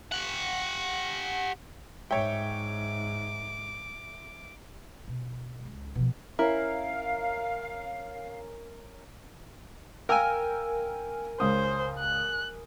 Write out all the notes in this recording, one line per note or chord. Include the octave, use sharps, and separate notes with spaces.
G4 F#5
G#2 C#5 E5 G5 D6
B2
C#2
B2 F3
C#4 E4 A#4 F5
A#4 F5 G5 G#5 E6
C#2 C5 D#6
F#6